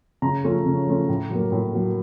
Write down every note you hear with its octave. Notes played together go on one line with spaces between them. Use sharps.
C#3 A#5
F3 A3 C#4
C#3
F3 A3 C#4
A2
F#3 A#3
A2
F#3 A#3